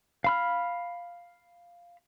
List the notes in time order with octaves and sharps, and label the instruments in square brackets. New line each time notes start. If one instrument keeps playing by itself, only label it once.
[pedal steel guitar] F5 B5 F6